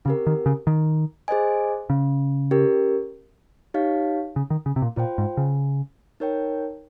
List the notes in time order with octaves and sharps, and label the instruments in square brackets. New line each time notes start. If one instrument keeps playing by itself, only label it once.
[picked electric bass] C#3 [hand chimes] C4 G4 A#4
[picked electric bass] D#3
C#3
D#3
[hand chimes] G#4 C5 D#5 G#5
[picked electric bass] C#3
[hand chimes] C#4 G4 A#4
D#4 G4 C#5 F5
[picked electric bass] C#3
D#3
C#3
C3
A#2
[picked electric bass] A#2 [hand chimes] F4 C5 G5
[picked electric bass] G#2
C#3
[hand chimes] D#4 A#4 C#5 G5